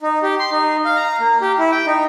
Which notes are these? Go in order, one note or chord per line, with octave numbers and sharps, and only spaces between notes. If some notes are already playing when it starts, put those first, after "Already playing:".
D#4
G4
C6
D#4
F5
A#5
A#3
G4
E4
G5
D#4